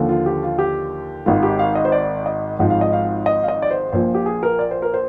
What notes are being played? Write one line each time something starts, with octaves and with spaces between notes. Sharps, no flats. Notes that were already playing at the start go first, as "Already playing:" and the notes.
Already playing: D#2 D3 F3
F4
G4
F4
G4
G#1 G#2 D#3 F4
G4
F5
D#5
C5
D5
D#5
G#1 G#2 F3
F5
D#5
F5
D#5
F5
D#5
D5
C5
A#1 A#2 F3 C5
G4
G#4
A#4
D5
C5
A#4
C5